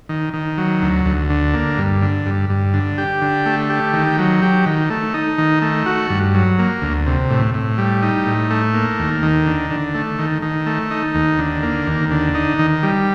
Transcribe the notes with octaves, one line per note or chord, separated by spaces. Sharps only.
D#3
D#3
F#3
D2
D2
D3
A#3
G2
D3
G2
G2
D3
G4
D3
A3
G4
D#3
F#3
G4
D#3
A3
D#4
D#3
A3
F#4
G2
F#3
A#3
D2
C3
A2
A2
G3
D#4
A2
A3
A#3
D#2
D#3
D3
D3
A3
D#3
D#3
A3
D#4
D#2
D3
A#3
D#2
D3
D#4
D#3
G3